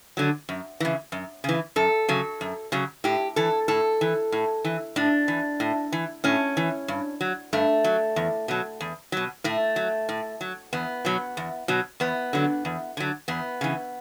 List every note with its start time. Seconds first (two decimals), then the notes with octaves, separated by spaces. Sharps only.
0.17 D3 F#3
0.49 F#2
0.80 C#3 E3
1.12 F#2
1.44 C#3 E3
1.76 F#2 A4
2.08 C#3 F#3
2.41 F#2
2.72 C#3 F#3
3.04 A2 G4
3.36 E3 A4
3.68 A2 A4
4.01 E3
4.32 A2
4.64 E3
4.96 A2 D4
5.28 E3
5.60 A2
5.92 E3
6.24 A2 C#4
6.57 E3
6.88 G2
7.21 F#3
7.53 G2 A3
7.84 F#3
8.16 E2
8.48 B2 F#3
8.81 E2
9.12 B2 F#3
9.44 A2 A3
9.76 F#3
10.09 A2
10.41 F#3
10.73 E2 B3
11.05 B2 F#3
11.37 E2
11.68 B2 F#3
12.00 E2 B3
12.33 D3 F#3
12.65 E2
12.97 D3 F#3
13.28 E2 B3
13.61 C#3 E3